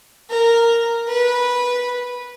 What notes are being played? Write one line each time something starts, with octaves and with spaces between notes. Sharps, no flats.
A#4
B4